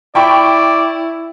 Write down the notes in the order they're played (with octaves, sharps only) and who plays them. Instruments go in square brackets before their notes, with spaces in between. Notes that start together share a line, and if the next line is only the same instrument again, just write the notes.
[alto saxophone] E4 [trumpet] D5 [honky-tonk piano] G5 B5 C#6